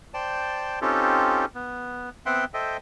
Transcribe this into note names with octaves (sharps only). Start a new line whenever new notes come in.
C5 D5 G5 A5
C4 C#4 D#4 F4 G4 A4
B3
B3 C4 E5 F#5 G5 C6
A4 C5 D#5 E5 G5